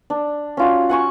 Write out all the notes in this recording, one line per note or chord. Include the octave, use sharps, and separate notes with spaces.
D4
C#4 F4 F#4
F#5 G#5 C#6